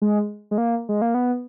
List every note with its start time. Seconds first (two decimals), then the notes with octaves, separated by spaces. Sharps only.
0.02 G#3
0.51 G#3
0.58 A#3
0.89 G#3
1.02 A#3
1.14 B3